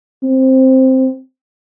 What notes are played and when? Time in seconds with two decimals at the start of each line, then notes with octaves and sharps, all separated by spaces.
0.23 C4